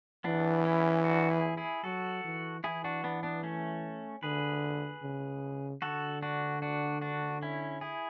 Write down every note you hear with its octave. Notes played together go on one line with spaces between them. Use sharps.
E3 B3 D4
C#4 E4
D4 F#4
E4 G#4
E4 G#4
F#3 F#4 A4
E3
E3 E4 G#4
D4 F#4
B3 D4
B3 D4
A3 C#4
D3 G#4 B4
C#3
D3 F#4 A4
D4 F#4
D4 F#4
D4 F#4
C#4 E4
E4 G#4